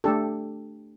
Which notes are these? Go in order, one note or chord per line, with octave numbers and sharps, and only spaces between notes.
A3 D4 G4 A4